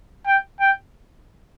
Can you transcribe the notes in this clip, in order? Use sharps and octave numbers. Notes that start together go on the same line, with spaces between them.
G5
G5